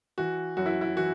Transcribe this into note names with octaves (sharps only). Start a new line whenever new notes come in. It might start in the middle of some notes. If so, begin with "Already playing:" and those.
E3 F#4
F#2 F#4
E4
E4
E3 F#4